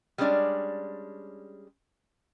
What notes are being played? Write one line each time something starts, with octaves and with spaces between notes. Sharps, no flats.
G3 G#3 C#4 D4 D5